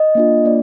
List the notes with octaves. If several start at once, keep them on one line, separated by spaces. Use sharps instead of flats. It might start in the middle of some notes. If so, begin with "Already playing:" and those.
Already playing: D#5
A#3 D4 F4
A#3 D4 D5